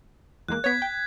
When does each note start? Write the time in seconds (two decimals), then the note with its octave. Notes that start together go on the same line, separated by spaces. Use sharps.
0.48 E2 G#3 A#3 F#6
0.64 B3 C#5 G#6 B6
0.82 G5